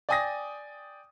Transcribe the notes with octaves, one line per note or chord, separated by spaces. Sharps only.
D5 G5 G#5 D#6 A6 A#6